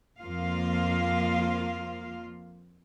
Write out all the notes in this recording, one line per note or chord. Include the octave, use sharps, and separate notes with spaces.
F2 F3 A#3 F4 F5